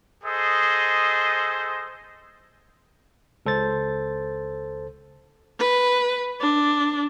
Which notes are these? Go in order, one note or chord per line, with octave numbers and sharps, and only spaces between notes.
G#4 A4 C5 D#5
C#2 A4 C5 A6
B4
D4